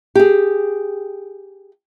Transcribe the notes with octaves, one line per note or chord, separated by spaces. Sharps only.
G4 G#4